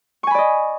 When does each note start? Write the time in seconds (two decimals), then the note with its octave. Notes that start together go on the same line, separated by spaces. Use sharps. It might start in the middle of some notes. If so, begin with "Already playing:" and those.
0.23 C#6
0.27 G#5
0.31 B5
0.35 D5
0.38 D#5